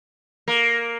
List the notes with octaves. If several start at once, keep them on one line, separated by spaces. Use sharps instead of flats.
A#3